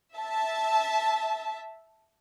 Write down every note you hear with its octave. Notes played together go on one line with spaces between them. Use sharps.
E5 A5